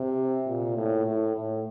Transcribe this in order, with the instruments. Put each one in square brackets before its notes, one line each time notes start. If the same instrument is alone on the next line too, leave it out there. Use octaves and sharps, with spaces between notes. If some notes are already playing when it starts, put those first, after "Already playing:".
Already playing: [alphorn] C3
A#2
A2
A2
A2